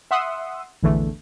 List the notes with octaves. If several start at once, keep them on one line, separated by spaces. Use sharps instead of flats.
E5 F#5 C6 D#6 E6
A#1 E2 D3 E3 A3